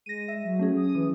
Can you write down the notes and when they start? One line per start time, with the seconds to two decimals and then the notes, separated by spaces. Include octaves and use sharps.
0.06 G#3 A#6 D#7
0.28 E5
0.44 F#3
0.59 A3 C#4 G#4
0.77 D#6
0.95 E3